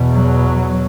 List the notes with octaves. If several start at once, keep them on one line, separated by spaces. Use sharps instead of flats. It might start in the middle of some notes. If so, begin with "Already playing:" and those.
Already playing: E2 B2
F#3